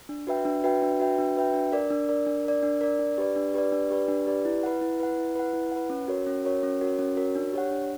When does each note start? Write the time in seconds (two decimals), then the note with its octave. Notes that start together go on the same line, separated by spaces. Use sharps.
0.09 D4
0.27 F#4 B4 E5 G5
0.45 D4
0.64 F#4 B4 E5 G5
0.82 D4
1.00 F#4 B4 E5 G5
1.18 D4
1.36 F#4 B4 E5 G5
1.54 D4
1.72 A#4 D5
1.90 D4
2.09 A#4 D5
2.27 D4
2.45 A#4 D5
2.63 D4
2.81 A#4 D5
2.99 D4
3.18 G4 B4 D5
3.36 D4
3.54 G4 B4 D5
3.72 D4
3.91 G4 B4 D5
4.08 D4
4.27 G4 B4 D5
4.45 E4
4.63 B4 F#5
4.81 E4
5.00 B4 F#5
5.18 E4
5.35 B4 F#5
5.53 E4
5.72 B4 F#5
5.90 C#4
6.08 F#4 A#4 C#5
6.27 C#4
6.44 F#4 A#4 C#5
6.63 C#4
6.81 F#4 A#4 C#5
6.99 C#4
7.17 F#4 A#4 C#5
7.35 D4
7.53 G4 C#5 F#5
7.71 D4